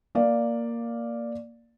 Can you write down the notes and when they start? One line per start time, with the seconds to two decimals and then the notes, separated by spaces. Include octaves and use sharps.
0.15 A#3 D5 F5